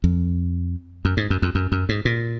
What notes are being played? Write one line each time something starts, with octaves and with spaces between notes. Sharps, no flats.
F2
F#2
G#2
F#2
F2
F#2
F#2
G#2
A#2